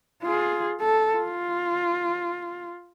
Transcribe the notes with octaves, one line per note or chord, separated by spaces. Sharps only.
F4 G#4
A4
F4